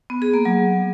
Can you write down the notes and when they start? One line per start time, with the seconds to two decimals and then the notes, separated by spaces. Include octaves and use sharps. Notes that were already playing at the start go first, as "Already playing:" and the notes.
0.10 B3
0.22 G#4
0.34 A#3
0.45 F#3